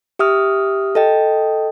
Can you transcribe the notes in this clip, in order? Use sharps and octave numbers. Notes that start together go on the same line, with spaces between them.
G4 E5 D#6 F6
A4 D#5 G5